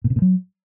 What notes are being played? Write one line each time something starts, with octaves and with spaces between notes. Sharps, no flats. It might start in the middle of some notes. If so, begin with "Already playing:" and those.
A#2
C3
A#2
F#3